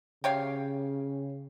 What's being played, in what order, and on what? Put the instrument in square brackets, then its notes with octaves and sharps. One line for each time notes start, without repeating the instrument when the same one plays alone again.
[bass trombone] C#3 [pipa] G4 C#5 F5